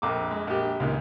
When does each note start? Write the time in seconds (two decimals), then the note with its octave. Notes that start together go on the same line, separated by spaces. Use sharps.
0.02 A#1 F2 D6
0.31 G#3
0.47 A#1 G4
0.80 C#2 A#2 D#3